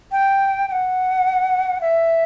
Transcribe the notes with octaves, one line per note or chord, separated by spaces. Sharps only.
G5
G5
F#5
E5